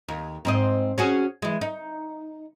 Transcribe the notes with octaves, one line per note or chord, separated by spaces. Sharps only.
D#2
G#2 C4 D#5
C#4 F#4 G#4
E3 G#3
D#4